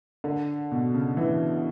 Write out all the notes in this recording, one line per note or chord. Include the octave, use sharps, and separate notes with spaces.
D3
B2
C#3
E3